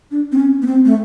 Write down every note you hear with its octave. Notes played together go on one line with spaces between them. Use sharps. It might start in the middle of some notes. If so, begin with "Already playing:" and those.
D4
C4
C#4
B3
C4
A3